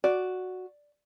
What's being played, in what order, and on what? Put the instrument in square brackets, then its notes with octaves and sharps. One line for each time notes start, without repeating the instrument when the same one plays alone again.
[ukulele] F#4 [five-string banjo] D5